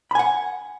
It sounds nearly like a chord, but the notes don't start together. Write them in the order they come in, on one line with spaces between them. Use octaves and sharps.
B5 G#5 F#5